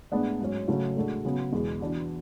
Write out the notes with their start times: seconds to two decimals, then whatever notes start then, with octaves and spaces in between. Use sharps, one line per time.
0.12 A2 G#3 B3 D4
0.41 G#2 F#3 C#4
0.68 C#3 F#3 A3 C#4 F#4
0.96 A2 G#3 D4 F#4 A4
1.25 C#3 F#3 B3
1.53 E2 B2 G#3
1.80 E3 B3 D4 F#4